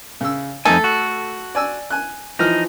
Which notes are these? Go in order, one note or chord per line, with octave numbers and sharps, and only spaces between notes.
C#3 E6
F2 A3 D#4 A4 G#5
F#4
D5 G#5 E6
G#5 F#6
E3 F3 D#4 F6